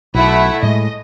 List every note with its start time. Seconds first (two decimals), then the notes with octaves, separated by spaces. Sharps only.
0.15 B1 A3 E4 F#5
0.63 A2 G#3 D#5